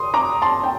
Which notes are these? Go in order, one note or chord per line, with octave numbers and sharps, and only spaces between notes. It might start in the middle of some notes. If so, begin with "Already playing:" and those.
Already playing: C6 D#6
A#5 D6
A5 C6
G5